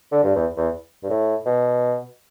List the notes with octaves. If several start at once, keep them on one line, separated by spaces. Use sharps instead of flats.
D3
G2
E2
E2
G2
A2
B2